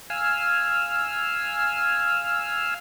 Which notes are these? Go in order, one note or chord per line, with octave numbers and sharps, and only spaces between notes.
F5 G#5 E6 F6